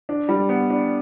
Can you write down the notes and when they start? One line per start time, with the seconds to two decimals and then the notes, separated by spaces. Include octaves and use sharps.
0.09 D4
0.29 G3
0.49 B3
0.70 D4